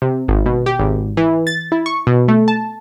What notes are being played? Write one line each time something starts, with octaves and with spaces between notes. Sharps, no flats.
C3
G#1
B2
G4
G#1
E3
A6
E4
C#6
B2
A3
A5